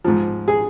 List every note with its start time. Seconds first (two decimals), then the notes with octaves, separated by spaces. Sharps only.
0.04 G#2 F3
0.48 G#4